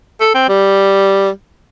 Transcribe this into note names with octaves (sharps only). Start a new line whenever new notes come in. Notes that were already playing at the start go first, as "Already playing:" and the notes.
A4
C4
G3